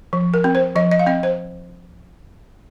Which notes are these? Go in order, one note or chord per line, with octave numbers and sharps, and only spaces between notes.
F3
A#4
C4
C5
F3 D#5
D#5
F5
C4 D#5
C5